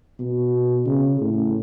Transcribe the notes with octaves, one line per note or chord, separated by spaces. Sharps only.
B2
C#3
A2